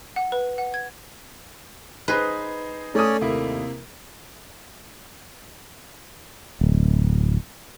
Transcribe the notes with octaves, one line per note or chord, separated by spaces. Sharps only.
F#5
B4
F#5
G#6
D#4 G#4 B4 C5
A3 C#4 C#5 D5 D#6
D#2 C3 A#3 E4
D1